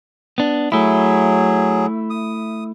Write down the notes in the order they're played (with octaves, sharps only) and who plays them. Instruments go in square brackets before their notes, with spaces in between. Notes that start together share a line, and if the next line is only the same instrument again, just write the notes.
[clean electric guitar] B3 D4
[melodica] F#3 G#4 [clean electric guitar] A3 E4
[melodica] D#6